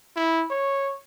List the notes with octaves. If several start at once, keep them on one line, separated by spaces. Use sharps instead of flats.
E4
C#5